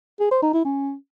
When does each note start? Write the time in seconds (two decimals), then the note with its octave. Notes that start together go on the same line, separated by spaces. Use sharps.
0.20 G#4
0.31 C5
0.43 D#4
0.54 E4
0.65 C#4